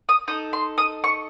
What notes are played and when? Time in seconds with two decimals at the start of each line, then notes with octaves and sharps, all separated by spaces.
0.09 D#6
0.28 D#4 A4 D#6
0.53 C6
0.78 D#6
1.04 C#6